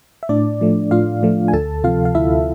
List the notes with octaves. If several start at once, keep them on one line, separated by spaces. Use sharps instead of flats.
E5
A2 D4 D5
F3 A3
A2 F4 F5
F3 A3
G#5
D2 A4 A5
C3 F3 F4 F5
F5
D2 E4 E5